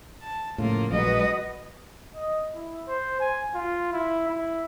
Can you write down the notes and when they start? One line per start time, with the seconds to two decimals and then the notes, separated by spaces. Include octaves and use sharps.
0.22 A5
0.58 A2 C#3 F3 A#3 F4
0.92 A#1 F#3 G#3 F#4 B4 D#5
2.15 D#5
2.54 E4
2.88 C5
3.20 G#5
3.55 F4
3.92 E4
4.28 E4